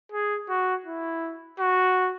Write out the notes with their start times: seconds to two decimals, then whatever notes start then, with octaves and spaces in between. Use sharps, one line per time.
0.12 G#4
0.49 F#4
0.86 E4
1.59 F#4